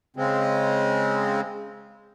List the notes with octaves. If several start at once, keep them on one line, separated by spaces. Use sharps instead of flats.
C#3 G#3 C4